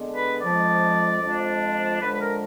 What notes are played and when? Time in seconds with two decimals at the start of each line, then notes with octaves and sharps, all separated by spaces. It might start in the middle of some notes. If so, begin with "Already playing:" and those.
Already playing: D3 G#3 B3 D4
0.16 B4
0.41 F2 F3 G#3 D5
1.21 F2 F3 G#3 D4
2.00 D3 F3 G#3 D4 B4
2.13 B4
2.20 A#4